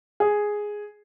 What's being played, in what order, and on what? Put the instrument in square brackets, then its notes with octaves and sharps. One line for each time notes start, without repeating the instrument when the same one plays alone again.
[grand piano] G#4